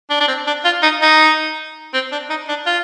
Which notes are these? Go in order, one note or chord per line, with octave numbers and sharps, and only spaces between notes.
D4
D4
C4
D4
F4
D#4
D#4
C4
D4
D#4
D4
F4